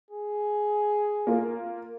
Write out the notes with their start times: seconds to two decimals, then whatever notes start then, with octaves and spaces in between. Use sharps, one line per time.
0.11 G#4
1.27 A#3 F4